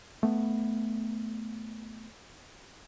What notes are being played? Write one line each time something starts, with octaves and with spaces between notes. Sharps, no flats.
A3 B3